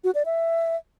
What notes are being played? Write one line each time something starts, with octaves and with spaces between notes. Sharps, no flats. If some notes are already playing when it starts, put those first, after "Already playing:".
F#4
D5
E5